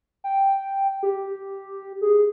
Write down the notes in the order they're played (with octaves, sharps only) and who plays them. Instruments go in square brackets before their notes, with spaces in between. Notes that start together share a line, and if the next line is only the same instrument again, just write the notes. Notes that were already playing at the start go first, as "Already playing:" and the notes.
[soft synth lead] G5
G4
G#4